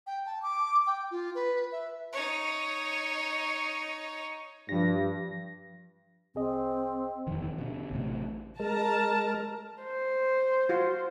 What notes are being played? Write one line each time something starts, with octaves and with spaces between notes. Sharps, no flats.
G5
A5
D6
G5
F4
B4
E5
D#4 C#5
G2 F3 A#6
C2 C4 G#4 D#5
D#1 F2 D#3 E3
B2 D3
A1 A2 C3
G#3 A#4 A5 A#5
C5
F4 F#4